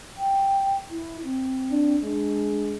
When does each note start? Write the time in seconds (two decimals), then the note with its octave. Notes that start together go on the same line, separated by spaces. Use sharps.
0.18 G5
0.90 E4
1.23 C4
1.71 D4
2.04 G#3 D4